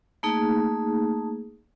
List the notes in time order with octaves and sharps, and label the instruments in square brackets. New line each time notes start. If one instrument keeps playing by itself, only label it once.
[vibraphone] A3 A#3 D#4 G#4